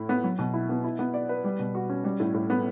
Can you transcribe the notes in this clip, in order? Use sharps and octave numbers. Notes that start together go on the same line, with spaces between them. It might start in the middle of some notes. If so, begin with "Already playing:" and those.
Already playing: A2
B3
F#3
B2
E4
B3
E4
B3
D5
B4
G3
B2
F#4
C#4
G3
A2
A2
B3